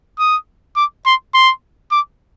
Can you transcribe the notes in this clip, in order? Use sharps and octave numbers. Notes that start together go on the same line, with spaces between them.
D#6
D6
C6
C6
D6